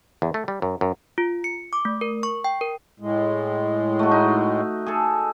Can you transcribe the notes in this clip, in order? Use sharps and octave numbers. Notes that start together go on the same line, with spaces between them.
E2
A3
G3
F#2
F#2
F4
C#7
D6
A3
A#4
C#6
G5
A#4
A2 G#3
A3 F#4
D#4
G#4 A4